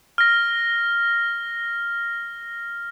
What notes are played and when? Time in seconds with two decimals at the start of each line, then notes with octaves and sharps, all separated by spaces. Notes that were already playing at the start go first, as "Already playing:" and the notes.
0.18 F6 A#6